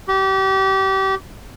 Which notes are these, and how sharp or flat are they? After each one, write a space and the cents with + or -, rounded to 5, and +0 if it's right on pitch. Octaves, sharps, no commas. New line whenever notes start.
G4 -30